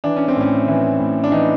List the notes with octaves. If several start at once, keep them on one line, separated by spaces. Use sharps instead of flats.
E3 D4
C#4
C4
A2 C#4
E3
A2
D4
E3 D#4